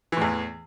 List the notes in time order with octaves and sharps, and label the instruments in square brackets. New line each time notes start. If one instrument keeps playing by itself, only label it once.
[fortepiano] E3
A2
E2